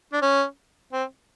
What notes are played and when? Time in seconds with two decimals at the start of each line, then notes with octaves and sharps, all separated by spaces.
0.13 D4
0.22 C#4
0.93 C4